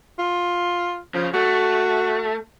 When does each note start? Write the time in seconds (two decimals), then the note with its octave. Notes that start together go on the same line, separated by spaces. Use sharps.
0.19 F4
1.14 C#3 F3
1.34 A3 F#4